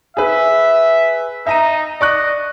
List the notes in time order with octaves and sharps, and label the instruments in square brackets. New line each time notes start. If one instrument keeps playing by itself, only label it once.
[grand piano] G#4 B4 [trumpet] E5
[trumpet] D#4 [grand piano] E5 A#5 D#7
[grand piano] D5 C#6 F#6 [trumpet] D#5